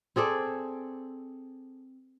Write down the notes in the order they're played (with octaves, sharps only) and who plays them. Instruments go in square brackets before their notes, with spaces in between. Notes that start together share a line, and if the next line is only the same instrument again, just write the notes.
[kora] C4 G#4 A4 D5